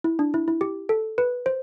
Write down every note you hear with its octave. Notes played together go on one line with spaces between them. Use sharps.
E4
D4
E4
E4
G4
A4
B4
C5